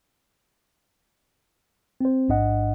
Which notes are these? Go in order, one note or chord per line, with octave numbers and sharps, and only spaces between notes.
C4 C5
A1 G#2 D4 D#5 F#5